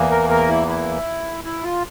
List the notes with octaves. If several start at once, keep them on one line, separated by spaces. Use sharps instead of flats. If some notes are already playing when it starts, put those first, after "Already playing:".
Already playing: E2 E3 A#3
A#4
A#4
E4
E4
E4
F4